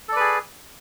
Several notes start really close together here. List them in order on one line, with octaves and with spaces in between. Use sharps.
A4 D5 B4 G#4